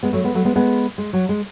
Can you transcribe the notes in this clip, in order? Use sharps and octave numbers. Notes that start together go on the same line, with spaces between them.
G#3 B3
F#3 A3
G#3 B3
F#3 A3
G#3 B3
G#3 B3
G#3
F#3
G#3